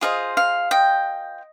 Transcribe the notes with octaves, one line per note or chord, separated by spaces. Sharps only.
F4 G#4 C5 D#5 F5
F5
D#5 G5